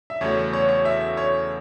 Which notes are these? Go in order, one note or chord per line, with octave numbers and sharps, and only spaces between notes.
E5
E2 C#3 A3 F#4 C#5
C#5
C#5
E5
C#5